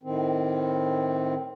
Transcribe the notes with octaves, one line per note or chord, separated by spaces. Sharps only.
A2 D#3 C4